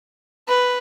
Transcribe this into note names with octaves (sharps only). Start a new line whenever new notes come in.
B4